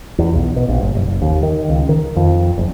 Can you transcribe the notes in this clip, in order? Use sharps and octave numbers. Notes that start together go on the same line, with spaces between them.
E2
B1
B2
A#1
G1
F#1
D#2
D#3
C#2
D#3
F2
F#1